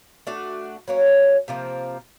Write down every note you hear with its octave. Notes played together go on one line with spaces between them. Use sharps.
A3 D4 F#4
F#3 A#3 C#4
C3 F3 A#3